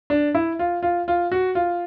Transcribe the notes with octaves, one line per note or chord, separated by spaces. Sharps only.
D4
E4
F4
F4
F4
F#4
F4